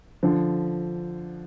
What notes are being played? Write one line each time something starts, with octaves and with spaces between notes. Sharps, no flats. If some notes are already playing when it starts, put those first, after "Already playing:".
D3 F3